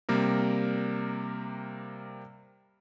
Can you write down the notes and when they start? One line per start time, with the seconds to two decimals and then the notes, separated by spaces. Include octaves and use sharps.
0.09 C3 G3 A#3 A#4